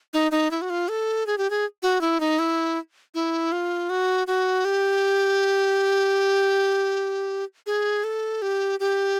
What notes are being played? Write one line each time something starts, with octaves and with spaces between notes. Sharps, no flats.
D#4
D#4
E4
F#4
F4
A4
G#4
G4
G#4
F#4
E4
D#4
E4
E4
F4
F#4
F#4
G4
G#4
A4
G4
G4